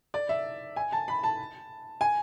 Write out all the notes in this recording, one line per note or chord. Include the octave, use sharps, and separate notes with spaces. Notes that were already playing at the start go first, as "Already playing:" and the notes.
D5
E5
G#5
A5
B5
A5
G#5